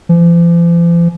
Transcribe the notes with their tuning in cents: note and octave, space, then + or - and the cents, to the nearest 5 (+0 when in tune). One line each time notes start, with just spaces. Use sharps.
F3 -45